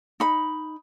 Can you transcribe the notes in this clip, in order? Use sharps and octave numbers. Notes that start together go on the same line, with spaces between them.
D#4 B5